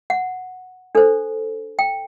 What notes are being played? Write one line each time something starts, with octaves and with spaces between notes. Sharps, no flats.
F#5
D4 A4 C5
G5